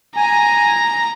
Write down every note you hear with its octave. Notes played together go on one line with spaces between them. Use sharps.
G#5 A#5